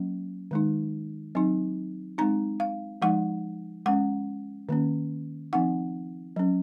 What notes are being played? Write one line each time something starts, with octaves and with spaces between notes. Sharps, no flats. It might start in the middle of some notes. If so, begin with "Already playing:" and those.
Already playing: F#3 A#3 C#4
D#3 G#3 D#4
F#3 C4 D#4
G#3 C4 D#4 A#5
F5
F3 G#3 D#4 F#5
G#3 C#4 F#5
D#3 A#3 C#4
F3 C4 D#4 F#5
F#3 C#4